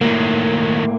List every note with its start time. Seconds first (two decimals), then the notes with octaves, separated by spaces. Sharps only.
0.01 A2 D#3 F#3 A#3